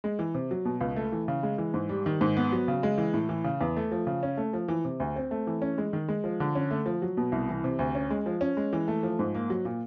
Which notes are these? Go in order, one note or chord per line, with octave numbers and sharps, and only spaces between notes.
G#3
E3
C3
F#3
B2
C#2
A3
E3
C#3
G#3
E3
G#2
G3
D#3
G#2
B3
F#3
C#3
G#3
E3
A2
E3
C#3
E2
A3
F3
C#3
C#4
A3
F3
E3
C3
D2
C4
A3
E3
C#4
G#3
D#3
G#3
F3
D3
C#4
A3
F3
F#3
B2
C2
E3
C3
D2
C#4
G#3
F3
C#4
G#3
E3
A3
F3
G#2
A#3
F#3
A#2